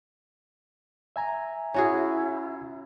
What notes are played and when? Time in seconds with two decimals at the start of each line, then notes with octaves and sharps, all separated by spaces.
1.16 E5 G#5 A#5
1.74 C#4 E4 F#4 G#4